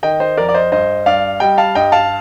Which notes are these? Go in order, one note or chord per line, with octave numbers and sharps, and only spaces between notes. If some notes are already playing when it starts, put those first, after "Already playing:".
D#3 D#5 G5
C5 D#5
F2 A#4 D5
D5
C5 D#5
G2 C5 D#5
G2 D5 F5
G3 D#5 G5
F5 A5
G2 D#5 G5
F5 A5